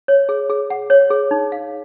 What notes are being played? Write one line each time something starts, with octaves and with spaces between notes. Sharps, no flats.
C#5
G#4
G#4
F#5
C#5
G#4
D#4
F5